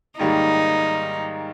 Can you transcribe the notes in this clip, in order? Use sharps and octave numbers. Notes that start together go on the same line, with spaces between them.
G#2 D#3 G3 A#3 D#4